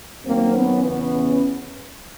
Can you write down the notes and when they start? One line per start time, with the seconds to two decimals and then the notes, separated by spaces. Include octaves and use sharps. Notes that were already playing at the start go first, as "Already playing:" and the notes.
0.24 F#2 D#3 F#3 A#3 C4
0.53 B3 C#4
0.82 E2 C#3 E3 B3 C#4